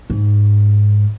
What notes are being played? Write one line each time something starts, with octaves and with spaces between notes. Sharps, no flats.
G#2